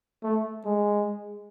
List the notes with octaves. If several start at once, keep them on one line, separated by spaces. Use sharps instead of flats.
A3
G#3